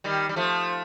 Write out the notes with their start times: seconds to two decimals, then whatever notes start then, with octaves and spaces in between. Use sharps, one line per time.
0.04 D#3 G3
0.29 G3
0.36 F3 A3